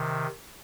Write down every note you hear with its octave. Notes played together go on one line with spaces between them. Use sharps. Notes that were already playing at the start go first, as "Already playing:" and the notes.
Already playing: C3 D#3